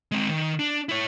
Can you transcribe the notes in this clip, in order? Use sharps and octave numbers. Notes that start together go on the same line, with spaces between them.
G#3 C4
D#3
D4
E4 C#5